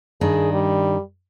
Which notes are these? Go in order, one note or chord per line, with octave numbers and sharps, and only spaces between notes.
G2 D#3 D4 G#4
G3